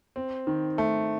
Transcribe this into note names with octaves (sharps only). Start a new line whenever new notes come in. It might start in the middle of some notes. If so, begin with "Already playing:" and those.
C4
D#3
A3